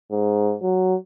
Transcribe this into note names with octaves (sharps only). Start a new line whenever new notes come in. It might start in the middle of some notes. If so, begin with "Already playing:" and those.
G#2
F#3